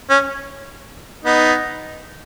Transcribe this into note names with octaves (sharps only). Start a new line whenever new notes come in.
C#4
B3 D#4